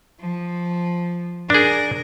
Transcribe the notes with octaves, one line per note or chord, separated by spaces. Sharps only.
F3
D4 G#4 A#4